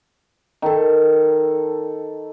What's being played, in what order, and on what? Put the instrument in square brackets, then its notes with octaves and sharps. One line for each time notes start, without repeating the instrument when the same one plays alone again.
[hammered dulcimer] D#3 A4